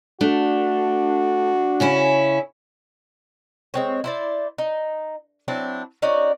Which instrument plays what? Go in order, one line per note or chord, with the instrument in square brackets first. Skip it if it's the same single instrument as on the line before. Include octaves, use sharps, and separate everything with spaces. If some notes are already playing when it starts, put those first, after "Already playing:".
[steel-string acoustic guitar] A3 [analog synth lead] D4 [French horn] F#4
[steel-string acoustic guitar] C#3 C#4 E4
[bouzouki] G#3 C4 C#5
E4 C5 D5
D#4
F#3 C4 D4 E4
C#4 D#4 F#4 D5